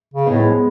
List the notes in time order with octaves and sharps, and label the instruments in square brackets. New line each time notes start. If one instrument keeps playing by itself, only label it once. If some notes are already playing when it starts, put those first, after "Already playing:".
[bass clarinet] C#3
[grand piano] B3 D#4
[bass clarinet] A2
[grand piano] G#3 B3
G#3 B3